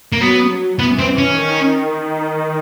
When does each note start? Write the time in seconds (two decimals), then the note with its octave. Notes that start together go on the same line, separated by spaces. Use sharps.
0.12 A#3
0.20 F#3 B3
0.50 F#3
0.79 E3 B3
0.99 C4
1.18 C#4
1.37 D#3